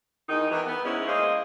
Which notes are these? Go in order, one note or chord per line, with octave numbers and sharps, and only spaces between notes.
E2 D#3 D#4
D#3 E3
B3
G#2 G#3 C#4 E4
G#3 A#3 C5 D#5